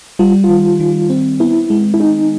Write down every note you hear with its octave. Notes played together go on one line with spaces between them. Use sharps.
G3 F4
F4
D#3
D#3
C4
B3 E4
G#3
E4
D#4 G#4